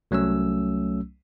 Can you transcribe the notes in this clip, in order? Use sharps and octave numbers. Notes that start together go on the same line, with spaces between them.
C2 F#3 A3 C#4 E6